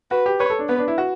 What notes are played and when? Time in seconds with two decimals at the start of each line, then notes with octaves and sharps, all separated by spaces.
0.11 F#4 B4
0.26 G4
0.40 B4 C#5
0.50 A4
0.59 D4
0.69 B3 B4
0.79 D4
0.88 E4
0.98 F#4